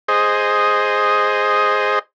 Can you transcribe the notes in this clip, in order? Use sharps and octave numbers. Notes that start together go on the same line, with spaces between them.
G#4 C5 D#5